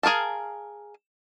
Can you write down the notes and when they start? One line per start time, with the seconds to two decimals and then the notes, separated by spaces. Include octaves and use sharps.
0.03 G#4 A#4 F5 A5